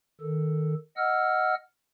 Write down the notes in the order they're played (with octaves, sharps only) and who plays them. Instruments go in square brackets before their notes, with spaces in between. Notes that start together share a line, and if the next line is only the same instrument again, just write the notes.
[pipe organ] D#3 A4
D#5 F#5 E6 F6